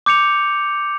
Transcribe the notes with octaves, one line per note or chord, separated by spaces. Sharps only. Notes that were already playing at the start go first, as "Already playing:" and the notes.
D6 G6 C#7 F7